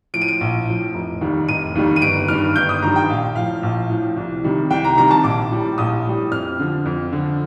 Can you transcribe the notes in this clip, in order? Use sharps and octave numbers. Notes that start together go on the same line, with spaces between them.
A2 F3 D7
D#7
D7
A#1
A2 F3
F1
D#2 D#3 G3
F1 D#7
D#2 D#3 G3
D#7
G1 D7
G2 D#3 G3 F6
G1 G6
D#6
G2 D#3 G3 A#5
G5
A#1 F5
A2 F3 F5
A#1
A2 F3
C2
C3 D#3 G3
C2 G5
A#5
C3 D#3 G3 A#5
A5
A#1 D6
A2 G3
A#1 D#6
A2 G3
F2 F6
D3 F3
F2
D3 F3